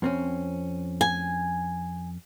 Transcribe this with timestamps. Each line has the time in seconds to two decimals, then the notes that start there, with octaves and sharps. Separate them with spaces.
0.02 F2 C4 C#4
1.01 G#5